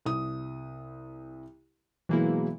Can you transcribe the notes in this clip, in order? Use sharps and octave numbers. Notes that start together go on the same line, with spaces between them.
C2 D#6
B2 E3 F#3 G#3 A#3 E4